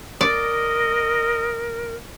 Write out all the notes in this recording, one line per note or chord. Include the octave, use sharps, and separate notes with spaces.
A#4 D5 D#5